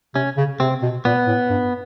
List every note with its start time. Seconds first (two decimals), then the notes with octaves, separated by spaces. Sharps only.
0.15 C3 C#4
0.37 C#3
0.60 C3 C4
0.82 B2
1.05 A#2 B3
1.27 A2
1.50 G2